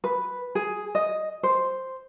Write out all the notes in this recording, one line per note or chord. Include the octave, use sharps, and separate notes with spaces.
B4
G#4
D#5
C5